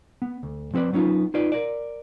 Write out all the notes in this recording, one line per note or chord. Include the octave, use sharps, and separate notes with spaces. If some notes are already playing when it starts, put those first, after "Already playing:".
B3
D2
F3 C4 A4 B4 D5
F#3 B3 C#4 D#4 F4
D#4 F4 B4 D5
A#4 D5